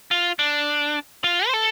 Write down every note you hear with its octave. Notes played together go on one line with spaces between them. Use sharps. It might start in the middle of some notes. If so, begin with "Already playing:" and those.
F4
D4
F4
C5
A4